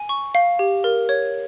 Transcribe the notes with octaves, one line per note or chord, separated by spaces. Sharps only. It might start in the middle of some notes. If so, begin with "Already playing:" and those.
Already playing: G#5
C#6
F5
G4
A#4
C#5